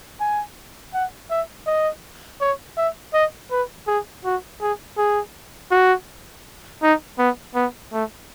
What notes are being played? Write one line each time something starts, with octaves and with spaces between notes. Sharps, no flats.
G#5
F#5
E5
D#5
C#5
E5
D#5
B4
G#4
F#4
G#4
G#4
F#4
D#4
B3
B3
A3